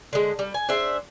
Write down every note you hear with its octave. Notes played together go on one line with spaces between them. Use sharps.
D3 G#3
G3
G#5
D4 G#4 C5 E5